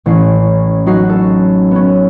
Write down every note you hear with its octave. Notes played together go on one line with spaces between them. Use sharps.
A1 C#4 C7
F#3 C#4 D#4 F#4 F#5 C7
A4
B3 C#4